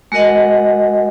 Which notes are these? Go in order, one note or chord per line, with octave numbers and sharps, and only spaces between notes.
G#3 F#4 A#4 D#5 F#5